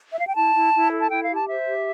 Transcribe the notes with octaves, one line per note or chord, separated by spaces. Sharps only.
E5
F5
G5
E4 A5
E4
E4
A4
A5
E4 G5
F5
G4
A5
C5 E5
G4